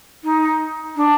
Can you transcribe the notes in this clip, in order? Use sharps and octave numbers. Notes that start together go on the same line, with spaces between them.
D#4
D4